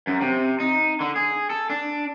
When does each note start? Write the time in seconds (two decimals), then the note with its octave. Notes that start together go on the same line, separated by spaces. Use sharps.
0.07 F#2
0.21 C3
0.60 D#4
1.00 D3
1.16 G#4
1.50 A4
1.70 D4